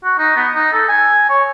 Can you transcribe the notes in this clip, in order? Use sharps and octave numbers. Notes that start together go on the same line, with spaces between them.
F#4
D#4
B3
D#4
A4
G#5
C#5